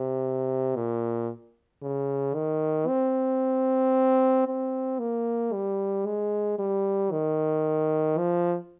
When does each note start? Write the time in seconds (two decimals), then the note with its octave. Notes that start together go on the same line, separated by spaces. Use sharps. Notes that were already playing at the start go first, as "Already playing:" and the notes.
Already playing: C3
0.76 A#2
1.82 C#3
2.35 D#3
2.88 C4
4.47 C4
4.99 A#3
5.53 G3
6.06 G#3
6.59 G3
7.12 D#3
8.18 F3